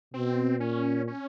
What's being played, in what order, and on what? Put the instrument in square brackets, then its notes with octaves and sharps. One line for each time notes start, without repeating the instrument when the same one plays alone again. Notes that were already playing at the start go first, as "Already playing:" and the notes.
[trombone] B2 [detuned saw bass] C4
[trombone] A#2 [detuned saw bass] C#4
[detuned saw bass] C#4